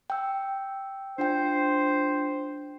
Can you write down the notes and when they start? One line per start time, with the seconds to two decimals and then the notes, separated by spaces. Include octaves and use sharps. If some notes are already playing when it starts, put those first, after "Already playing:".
0.10 G5 E6
1.18 D4 F4 C5 G5